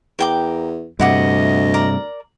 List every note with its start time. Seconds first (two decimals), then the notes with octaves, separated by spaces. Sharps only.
0.19 E2 A#4 G5 D6
1.00 D2 G2 C3 E4 D#5 F#5 D6
1.74 A#4 D5 A#5